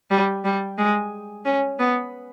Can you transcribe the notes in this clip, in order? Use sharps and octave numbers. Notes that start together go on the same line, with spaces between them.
G3
G3
G#3
C#4
B3